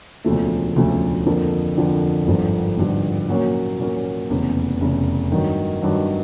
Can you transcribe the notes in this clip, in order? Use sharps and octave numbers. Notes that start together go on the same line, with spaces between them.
E1 D2 C#3 F3 A3
E1 D2 C#3 F3 A3
F2 D3 F3 A#3
F2 D3 F3 A#3
G#1 G2 D3 F3
G#1 G2 D3 F3
A#2 F#3 A#3 C#4
A#2 F#3 A#3 C#4
F1 E2 C#3
F1 E2 C#3
G2 D#3 F#3
G2 D#3 F#3